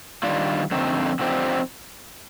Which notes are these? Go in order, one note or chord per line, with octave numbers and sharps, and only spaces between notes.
D#3 G3 D4 F4
F2 D3 A3 C4 D#4
D3 F3 C4 D#4 G4